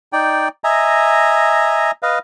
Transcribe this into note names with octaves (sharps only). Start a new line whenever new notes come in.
D#4 D5 G5
D#5 E5 G#5 A#5
B4 D#5 F5